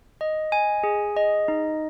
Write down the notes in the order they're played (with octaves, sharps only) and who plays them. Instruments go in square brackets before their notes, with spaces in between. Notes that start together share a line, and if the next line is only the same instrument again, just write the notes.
[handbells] D#5
G#5
G#4
D#5
D#4